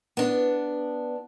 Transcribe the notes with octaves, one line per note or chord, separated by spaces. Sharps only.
B3 D4